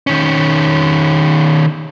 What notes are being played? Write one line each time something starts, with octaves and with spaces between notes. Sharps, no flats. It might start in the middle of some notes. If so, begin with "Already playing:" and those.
D#3 C#4